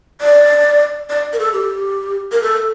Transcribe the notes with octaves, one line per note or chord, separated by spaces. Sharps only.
D5
D5
A#4
A4
G4
A#4
A4